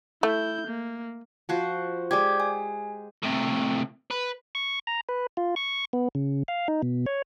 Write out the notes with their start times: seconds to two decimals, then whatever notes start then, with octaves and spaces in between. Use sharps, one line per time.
0.23 A3 E4 G6
0.67 A#3
1.49 F3 F#4 C5
2.11 G#3 G4 D5 D6 G#6
2.40 G#5
3.23 A2 C3
4.11 B4
4.55 C#6
4.87 A#5
5.09 B4
5.37 F4
5.56 C#6
5.93 B3
6.15 C#3
6.48 F5
6.68 D#4
6.82 B2
7.06 C#5